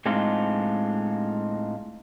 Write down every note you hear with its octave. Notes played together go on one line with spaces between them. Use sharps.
A2 G#3 C4 D4 D#4 F4